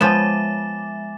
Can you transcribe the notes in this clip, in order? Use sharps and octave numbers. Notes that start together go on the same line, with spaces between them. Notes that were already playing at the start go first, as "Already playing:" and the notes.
F3 G#3 B3 E5 G#5 D6 A6 E7